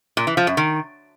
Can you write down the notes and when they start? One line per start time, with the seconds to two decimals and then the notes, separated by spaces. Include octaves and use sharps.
0.17 A#2
0.27 E3
0.37 F3
0.47 F#2
0.57 D#3